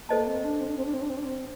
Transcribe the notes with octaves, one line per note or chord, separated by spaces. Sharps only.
A#3 A4 C5 D#5 A5
C4
D4
C4
D4
C4
D4
C4
D4
C4
D4
C4